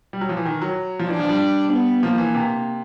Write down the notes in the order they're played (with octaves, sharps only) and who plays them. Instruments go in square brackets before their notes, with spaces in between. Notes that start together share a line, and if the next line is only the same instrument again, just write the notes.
[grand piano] G3
F#3
F3
E3
D#3
F#3
F3
[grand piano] E3 [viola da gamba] D4
[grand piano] F3
G3
[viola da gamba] B3
[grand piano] F3 [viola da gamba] A#3
[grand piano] E3
C3